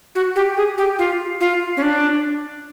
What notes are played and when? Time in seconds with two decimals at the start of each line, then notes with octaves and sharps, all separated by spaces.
0.15 F#4
0.36 G4
0.57 G#4
0.78 G4
0.99 F4
1.40 F4
1.77 C#4
1.82 D4